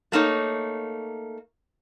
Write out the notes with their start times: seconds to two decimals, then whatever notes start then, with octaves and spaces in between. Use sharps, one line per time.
0.12 A3 A#3 D#4 C#5